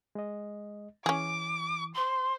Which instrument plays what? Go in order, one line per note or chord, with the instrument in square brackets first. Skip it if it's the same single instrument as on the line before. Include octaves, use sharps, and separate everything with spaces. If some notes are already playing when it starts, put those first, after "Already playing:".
[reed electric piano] G#3 D#5
[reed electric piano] E3 [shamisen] C#4 G#4 [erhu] D6
[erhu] C5 [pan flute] C6